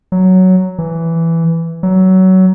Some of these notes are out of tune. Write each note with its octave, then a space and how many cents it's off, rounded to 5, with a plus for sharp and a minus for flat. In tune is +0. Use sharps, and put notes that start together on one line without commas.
F#3 +5
E3 +5
F#3 +20